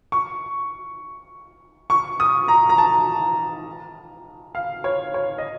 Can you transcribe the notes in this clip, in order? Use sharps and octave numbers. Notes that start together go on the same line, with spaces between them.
C#6
C#6
D#6
A#5
A#5
A5
F5
C#5
C#5
D#5